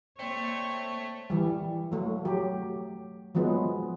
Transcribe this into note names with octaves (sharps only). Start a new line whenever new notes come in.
A3 A#3 C4 C#5 D5
E3 G3
F#3 A3
F#3 G4
F3 F#3 G#3 B3